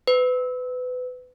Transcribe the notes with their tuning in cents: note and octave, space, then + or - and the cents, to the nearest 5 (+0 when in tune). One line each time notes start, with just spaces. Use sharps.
B4 +25